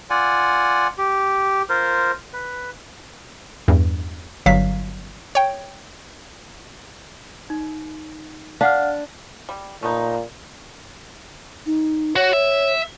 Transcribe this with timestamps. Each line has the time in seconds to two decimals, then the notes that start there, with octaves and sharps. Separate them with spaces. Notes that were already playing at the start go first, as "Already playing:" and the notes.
0.10 F4 D5 F#5 G#5
0.98 G4
1.69 F4 A#4 C5
2.33 B4
3.68 E2 G2
4.46 G1 F#3 F5 B6
5.35 C#5 G5
7.50 D#4
8.61 D4 F5 F#5 F6
9.49 G3
9.83 A#2 A3 B3 D#4
11.66 D#4
12.16 F#4 C#5
12.33 E5